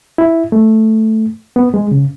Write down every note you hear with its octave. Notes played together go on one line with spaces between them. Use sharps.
E4
A3
B3
G#3
C#3